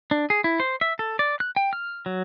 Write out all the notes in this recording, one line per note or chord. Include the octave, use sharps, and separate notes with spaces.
D4
G#4
E4
C5
E5
A4
D5
F#6
G5
F6
F#3